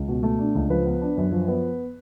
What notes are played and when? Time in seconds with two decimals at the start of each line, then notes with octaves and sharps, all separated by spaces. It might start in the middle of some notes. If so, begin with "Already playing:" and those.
Already playing: C#2
0.08 B2
0.23 A3
0.39 D4
0.55 C#2
0.70 F3 B4
0.86 B3
1.01 D4
1.17 F#2
1.32 F3
1.48 B3